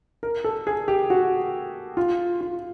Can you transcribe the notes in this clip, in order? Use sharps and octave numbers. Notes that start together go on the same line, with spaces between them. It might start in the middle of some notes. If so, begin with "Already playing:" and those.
A#4
A4
G#4
G4
F#4
F4
F4